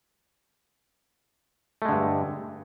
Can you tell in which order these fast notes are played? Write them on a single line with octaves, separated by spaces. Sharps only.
A3 G#3 D3 G2